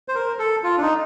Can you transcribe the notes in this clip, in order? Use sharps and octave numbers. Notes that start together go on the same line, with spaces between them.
C5
A#4
A4
F4
D4
D#4